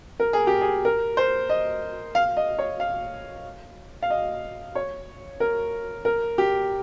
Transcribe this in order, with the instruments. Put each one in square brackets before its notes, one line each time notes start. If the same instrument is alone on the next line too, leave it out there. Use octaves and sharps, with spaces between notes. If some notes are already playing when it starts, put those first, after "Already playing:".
[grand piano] A#4
G#4
G4
G#4
A#4
C5
D#5
F5
D#5
C#5
F5
F5
D#5
C#5
A#4
A#4
G4